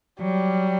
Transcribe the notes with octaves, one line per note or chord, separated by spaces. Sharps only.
F#3 G3